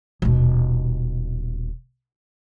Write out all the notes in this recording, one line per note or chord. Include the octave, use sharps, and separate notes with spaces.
D#1 B2